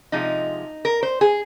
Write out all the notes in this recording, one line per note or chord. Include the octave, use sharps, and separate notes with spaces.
C3 F3 G#3 D#4
A#4
C5
G#4